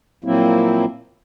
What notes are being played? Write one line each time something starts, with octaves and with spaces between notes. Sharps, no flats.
A#2 F3 F#3 A#3 C4 E4